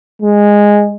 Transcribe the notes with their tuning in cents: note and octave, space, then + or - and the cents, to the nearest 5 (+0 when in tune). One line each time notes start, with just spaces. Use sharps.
G#3 -10